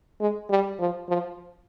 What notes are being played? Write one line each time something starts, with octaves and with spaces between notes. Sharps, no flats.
G#3
G3
F3
F3